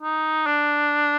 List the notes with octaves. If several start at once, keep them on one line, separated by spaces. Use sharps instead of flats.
D#4
D4